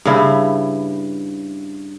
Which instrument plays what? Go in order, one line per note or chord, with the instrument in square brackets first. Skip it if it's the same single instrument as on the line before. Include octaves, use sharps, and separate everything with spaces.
[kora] G2 C#3 E4